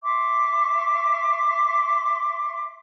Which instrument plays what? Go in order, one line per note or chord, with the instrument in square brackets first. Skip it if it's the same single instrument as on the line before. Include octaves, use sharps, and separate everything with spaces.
[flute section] E5 C6 D6